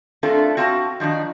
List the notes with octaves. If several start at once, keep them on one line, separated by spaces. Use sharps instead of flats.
A3 C4 D4 F4 A4 A#4
C4 F#4 F5 G5 A5
D#3 F3 D4 D#4